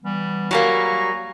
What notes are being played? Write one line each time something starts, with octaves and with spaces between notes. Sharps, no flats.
E3 G3 B3
F#3 G3 A#3 G#5 A#5 C#6